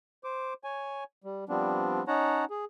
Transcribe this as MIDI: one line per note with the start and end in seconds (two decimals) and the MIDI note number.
0.24 0.54 72
0.24 0.54 86
0.64 1.04 73
0.64 1.04 80
1.24 1.44 55
1.49 2.04 53
1.49 2.04 55
1.49 2.04 59
1.49 2.04 60
1.49 2.04 62
2.08 2.45 61
2.08 2.45 63
2.08 2.45 73
2.08 2.45 78
2.08 2.45 81
2.08 2.45 82
2.50 2.65 68